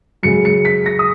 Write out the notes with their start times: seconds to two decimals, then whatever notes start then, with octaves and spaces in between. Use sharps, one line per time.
0.23 F#2 C#3 G#3 C#7
0.45 C#7
0.65 B6
0.86 A#6
0.99 D#6